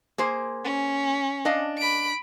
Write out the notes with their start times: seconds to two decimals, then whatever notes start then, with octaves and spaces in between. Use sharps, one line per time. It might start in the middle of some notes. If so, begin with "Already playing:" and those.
0.18 A#3 G#4 C5
0.64 C#4
1.45 D4 D#5 F5
1.78 B5 D7